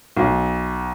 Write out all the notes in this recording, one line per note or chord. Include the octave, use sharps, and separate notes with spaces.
B1